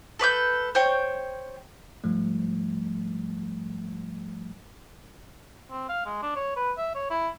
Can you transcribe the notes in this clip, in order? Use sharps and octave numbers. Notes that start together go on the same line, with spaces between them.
A4 B4 D6 G6
C5 C#5 G5
G#2 F3 G3 A3
C4
F5
G#3
D4
C#5
B4
E5
C#5
E4